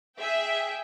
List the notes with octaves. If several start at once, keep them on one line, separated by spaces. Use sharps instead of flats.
G#4 E5 G5